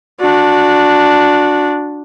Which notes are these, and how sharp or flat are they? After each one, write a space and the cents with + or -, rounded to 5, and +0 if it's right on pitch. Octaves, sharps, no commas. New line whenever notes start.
D4 +0 F#4 -25